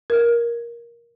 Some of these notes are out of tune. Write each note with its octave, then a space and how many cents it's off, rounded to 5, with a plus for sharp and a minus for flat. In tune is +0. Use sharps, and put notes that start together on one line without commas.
A#4 +15